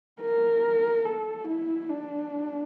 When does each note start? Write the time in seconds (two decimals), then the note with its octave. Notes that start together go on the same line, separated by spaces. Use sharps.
0.21 A#4
1.05 A4
1.47 E4
1.89 D4